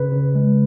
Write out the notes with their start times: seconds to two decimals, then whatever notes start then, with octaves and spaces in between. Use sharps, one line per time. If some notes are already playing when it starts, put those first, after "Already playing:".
Already playing: C#3 B4
0.12 C#3
0.35 G#3